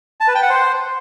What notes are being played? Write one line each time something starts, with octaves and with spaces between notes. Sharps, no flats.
A5
B4
G5
F#5
C5